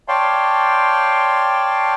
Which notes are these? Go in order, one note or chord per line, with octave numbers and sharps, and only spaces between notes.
C#5 D5 F5 G5 A5 C6